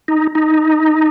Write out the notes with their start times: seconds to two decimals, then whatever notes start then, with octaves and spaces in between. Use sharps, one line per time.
0.08 D#4
0.35 D#4